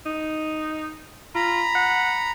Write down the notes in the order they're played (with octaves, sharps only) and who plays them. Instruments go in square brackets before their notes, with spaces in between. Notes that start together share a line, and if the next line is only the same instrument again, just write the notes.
[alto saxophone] D#4
[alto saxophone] F4 [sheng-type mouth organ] A#5 B5
[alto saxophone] F#5